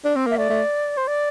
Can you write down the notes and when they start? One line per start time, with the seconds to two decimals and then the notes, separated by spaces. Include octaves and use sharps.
0.05 D4
0.16 C4
0.26 A#3 E5
0.37 A3 D5
0.50 A3
0.97 C5
1.08 D5